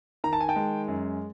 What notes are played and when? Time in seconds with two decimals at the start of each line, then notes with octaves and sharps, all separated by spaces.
0.24 D#3 A#5
0.33 A5
0.41 G#5
0.49 G5 A5
0.56 G#3
0.88 F#2